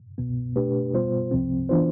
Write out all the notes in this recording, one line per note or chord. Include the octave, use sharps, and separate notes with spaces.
C2 B2 B3
B2 A3 D4 G4 B4
B2 G3 B3 F4 C5
C2 C3 F3 C4
E3 B3 D4 F4 C5